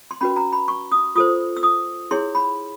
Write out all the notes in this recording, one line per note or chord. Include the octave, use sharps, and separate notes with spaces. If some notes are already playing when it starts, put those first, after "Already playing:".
C6
C#4 F#4 B4 B5
A#5
B5
C#6
D#6
F4 A4 C5 D#6
E6
D#6
E4 G#4 C#5 C6
B5